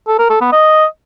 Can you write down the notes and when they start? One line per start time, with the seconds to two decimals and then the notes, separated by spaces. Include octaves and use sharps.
0.08 A4
0.19 A#4
0.30 A4
0.41 B3
0.52 D#5